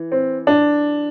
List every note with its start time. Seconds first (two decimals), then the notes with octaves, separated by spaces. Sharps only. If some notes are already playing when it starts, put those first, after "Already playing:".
Already playing: E3
0.12 C4
0.47 D4